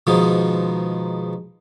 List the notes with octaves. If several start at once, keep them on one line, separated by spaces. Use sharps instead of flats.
G#2 B2 D#3 F3 G#3